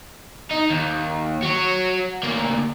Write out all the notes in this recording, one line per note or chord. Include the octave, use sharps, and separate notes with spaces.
D#4
D#2
F#4 C#5
D2 A#3